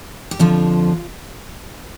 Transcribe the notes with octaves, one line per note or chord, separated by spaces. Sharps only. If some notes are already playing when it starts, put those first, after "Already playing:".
G4
F2 D3 F3 F4